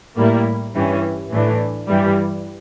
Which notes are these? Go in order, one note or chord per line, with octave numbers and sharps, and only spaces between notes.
A2 G3 A#3 E4
G2 E3 G3 C#4
A2 E3 A3 D4
G2 E3 G3